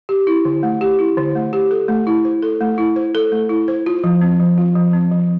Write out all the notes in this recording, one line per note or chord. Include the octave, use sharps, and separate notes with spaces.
G4
E4
D3
A3
G4
E4
D3
A3
G4
A4
A3
E4
C5
A4
A3
E4
C5
A4
A3
E4
C5
F4
F3
C4
F3
F4
F3
C4
F3